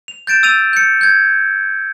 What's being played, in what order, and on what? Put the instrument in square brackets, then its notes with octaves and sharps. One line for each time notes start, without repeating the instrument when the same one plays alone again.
[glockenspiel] F7
G6 A6 D7 E7
E6 A6 D#7 F7
G6 C#7
G6 G#6